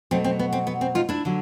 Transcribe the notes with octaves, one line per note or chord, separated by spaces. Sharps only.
B2 F#3 A3 C4
C4
B3
C4
B3
C4
D#4 F4
D4 E4
D3 F#3